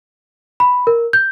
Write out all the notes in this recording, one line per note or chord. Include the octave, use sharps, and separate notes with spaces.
B5
A#4
G6